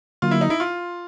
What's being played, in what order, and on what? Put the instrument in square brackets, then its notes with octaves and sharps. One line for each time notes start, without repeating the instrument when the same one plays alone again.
[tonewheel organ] D3 F#3 A#3 [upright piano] F4
[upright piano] E4
D#4
E4
F4